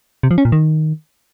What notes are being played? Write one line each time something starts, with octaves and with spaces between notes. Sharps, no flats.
C3
F3
C#4
A#2
D#3